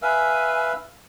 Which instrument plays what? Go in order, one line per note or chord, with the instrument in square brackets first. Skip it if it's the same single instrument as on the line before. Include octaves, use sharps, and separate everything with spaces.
[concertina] B4 E5 F5 [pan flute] G#5